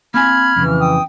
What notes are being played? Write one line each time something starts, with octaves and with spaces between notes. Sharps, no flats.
A#3 C4 G#5 B5 F6 G#6
F2 C#3 E3
G5 D#6